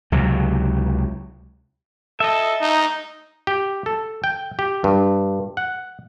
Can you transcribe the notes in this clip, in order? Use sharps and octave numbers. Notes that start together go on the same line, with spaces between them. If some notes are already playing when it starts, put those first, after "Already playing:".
C#2 C3 F#3
A4 D#5 E5
D#4
G4
A4
G5
G4
G2
F#5